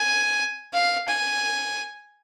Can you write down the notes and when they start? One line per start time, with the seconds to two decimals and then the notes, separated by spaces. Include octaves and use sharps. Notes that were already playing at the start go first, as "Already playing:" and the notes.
Already playing: G#5
0.73 F5
1.08 G#5